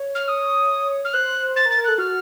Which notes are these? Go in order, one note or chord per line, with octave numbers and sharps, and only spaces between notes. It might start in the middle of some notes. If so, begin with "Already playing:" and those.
Already playing: C#5
F6
D#6
F6
C5 F#6
C5 A6
A#4
A6
A#4
A4 F#6
F#4 F6